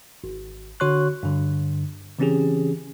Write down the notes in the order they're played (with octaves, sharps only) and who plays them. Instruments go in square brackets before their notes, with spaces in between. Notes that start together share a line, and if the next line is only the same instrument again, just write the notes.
[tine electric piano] G#1
D3 F#4 C#5 C6 C#6 F#6
G2 D3
C#3 E3 C4 C#4 G4 G#4